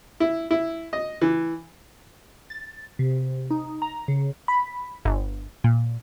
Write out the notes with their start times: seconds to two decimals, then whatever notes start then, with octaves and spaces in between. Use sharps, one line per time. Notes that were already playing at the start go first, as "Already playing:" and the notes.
0.20 E4
0.51 E4
0.93 D#5
1.21 E3
2.50 A6
2.99 C3
3.51 D#4
3.82 A#5
4.08 C#3
4.48 B5
5.05 G1
5.64 A#2